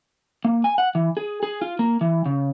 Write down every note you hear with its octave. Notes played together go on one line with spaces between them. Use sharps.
A#3
G#5
F#5
E3
G#4
G#4
F4
A#3
E3
C#3